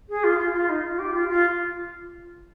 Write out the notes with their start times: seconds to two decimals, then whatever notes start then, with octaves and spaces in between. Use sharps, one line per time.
0.09 G#4
0.23 F4
0.38 F4
0.53 F4
0.69 D#4
0.83 F4
0.98 G4
1.13 F4
1.29 F4